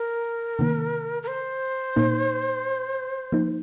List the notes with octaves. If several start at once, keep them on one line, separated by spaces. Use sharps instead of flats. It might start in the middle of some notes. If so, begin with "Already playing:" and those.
Already playing: A#4
C3 D#3 A#3
A#4
C5
A#2 A#3 D#4
F3 A#3 D#4